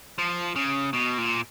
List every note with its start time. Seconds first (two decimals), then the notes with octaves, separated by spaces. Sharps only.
0.18 F3
0.56 C#3
0.93 B2
1.18 A#2